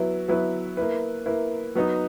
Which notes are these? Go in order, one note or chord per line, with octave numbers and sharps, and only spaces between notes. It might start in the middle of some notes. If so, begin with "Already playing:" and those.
Already playing: F#3 B3 E4 B4
F#3 B3 E4 B4
A#3 E4 B4
A#3 E4 B4
F#3 B3 D#4